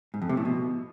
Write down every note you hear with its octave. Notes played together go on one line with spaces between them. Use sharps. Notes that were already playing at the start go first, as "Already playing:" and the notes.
G#2
F2
C3
A2
B2